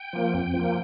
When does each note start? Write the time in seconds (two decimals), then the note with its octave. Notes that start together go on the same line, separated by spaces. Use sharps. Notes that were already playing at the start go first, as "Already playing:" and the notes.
Already playing: G5
0.13 F3 A#3
0.34 F2
0.54 F3
0.59 A#3